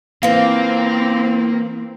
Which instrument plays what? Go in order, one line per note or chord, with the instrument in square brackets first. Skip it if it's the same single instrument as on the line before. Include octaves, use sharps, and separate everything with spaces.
[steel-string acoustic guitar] E3 F4 [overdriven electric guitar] A#3 [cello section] C4 [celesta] F5